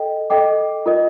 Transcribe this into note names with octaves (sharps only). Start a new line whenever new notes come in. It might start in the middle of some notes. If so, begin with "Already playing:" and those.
Already playing: A4 D#5 G5
A4 D#5 G5 D6
F4 A#4 D#5